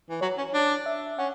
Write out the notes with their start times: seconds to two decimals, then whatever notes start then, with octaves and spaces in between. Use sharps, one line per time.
0.10 E3
0.21 F#3 C#5
0.38 C#4
0.54 D4
0.86 E5
1.18 C#4 F#5